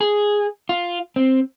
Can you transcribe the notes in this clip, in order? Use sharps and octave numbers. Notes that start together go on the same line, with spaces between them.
G#4
F4
C4